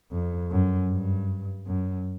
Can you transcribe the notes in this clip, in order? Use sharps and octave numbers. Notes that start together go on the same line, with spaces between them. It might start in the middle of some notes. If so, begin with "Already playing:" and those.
F2
F#2
G2
F#2